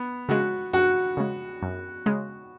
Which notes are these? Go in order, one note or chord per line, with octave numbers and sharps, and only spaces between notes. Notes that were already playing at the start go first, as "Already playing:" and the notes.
Already playing: B3
C#3 G#3 F#4
F#2 F#4
C#3 G#3
F#2
C#3 G#3